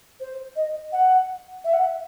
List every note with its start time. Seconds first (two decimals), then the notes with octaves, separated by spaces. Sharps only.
0.20 C5
0.56 D#5
0.92 F#5
1.64 E5
1.73 F#5
1.82 E5